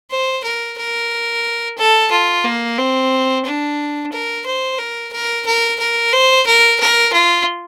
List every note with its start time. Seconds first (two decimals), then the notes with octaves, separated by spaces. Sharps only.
0.10 C5
0.44 A#4
0.78 A#4
1.77 A4
2.11 F4
2.44 A#3
2.78 C4
3.45 D4
4.12 A#4
4.45 C5
4.79 A#4
5.12 A#4
5.46 A#4
5.79 A#4
6.12 C5
6.46 A#4
6.80 A#4
7.13 F4